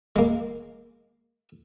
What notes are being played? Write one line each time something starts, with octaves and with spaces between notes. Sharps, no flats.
G#3 A#3